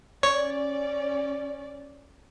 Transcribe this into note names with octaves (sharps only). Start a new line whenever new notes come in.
C#4 C#5 D5